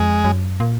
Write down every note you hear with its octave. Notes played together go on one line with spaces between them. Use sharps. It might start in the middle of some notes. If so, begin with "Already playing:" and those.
Already playing: F2 G#3
F#2
A#2